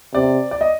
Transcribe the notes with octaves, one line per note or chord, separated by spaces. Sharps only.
C3 D5
D5
D#5